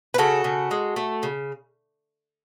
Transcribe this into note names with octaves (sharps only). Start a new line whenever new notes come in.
B4
C#3 F#4 A4
C#3
G#3
A3
C#3